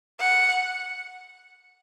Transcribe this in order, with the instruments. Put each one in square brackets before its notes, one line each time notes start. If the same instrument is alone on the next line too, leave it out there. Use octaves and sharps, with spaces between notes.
[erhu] F#5